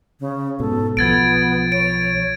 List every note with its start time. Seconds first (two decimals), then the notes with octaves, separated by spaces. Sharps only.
0.20 C#3
0.60 G#2 B2 A4
0.97 B1 F3 B3 G#6 A6 D7
1.72 C#5 D7